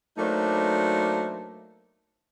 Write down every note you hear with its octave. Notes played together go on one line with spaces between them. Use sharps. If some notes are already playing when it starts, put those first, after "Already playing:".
F#3 A3 A#3 D4 D#4 C5